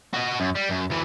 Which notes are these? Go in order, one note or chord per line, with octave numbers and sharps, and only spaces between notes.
F#4 D#5
F#2
G3
F#2
D2 E3